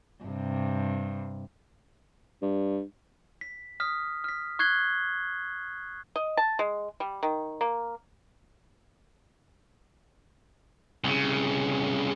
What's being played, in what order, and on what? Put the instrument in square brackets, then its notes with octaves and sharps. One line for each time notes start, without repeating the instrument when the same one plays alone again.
[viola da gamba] G2 C3
[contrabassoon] G2
[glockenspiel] B6
D#6 F6 B6
F6 B6
C#6 F#6 G#6 C7 G7
[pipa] D#5
A5
G#3
G3
D#3
A#3
[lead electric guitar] C2 C#3